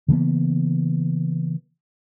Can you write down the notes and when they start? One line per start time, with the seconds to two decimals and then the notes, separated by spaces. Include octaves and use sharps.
0.08 C#3 E3 A#3 B3